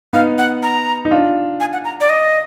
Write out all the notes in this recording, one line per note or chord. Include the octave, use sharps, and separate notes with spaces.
B3 D#4 F5
F#5
A#5
D#4
D4 F4
G#5
F#5
A#5
D5
D#5